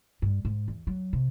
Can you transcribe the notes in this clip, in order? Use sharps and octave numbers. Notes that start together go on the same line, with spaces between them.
G2
G#2
E2
F#3
C3